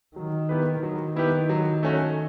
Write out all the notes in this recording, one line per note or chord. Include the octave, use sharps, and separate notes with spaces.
D#3 F#3
B3 E4 G4 B4
D#3 F#3
B3 E4 G4 B4
F#3
A3 C#4 F#4